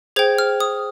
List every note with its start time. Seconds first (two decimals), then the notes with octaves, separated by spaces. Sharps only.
0.16 G#4 C5 G5 G#6
0.38 F6
0.60 D#6